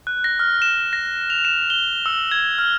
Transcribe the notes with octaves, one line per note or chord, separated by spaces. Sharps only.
F#6
A#6
F6
E7
A#6
F7
E7
G7
E6
G#6
F6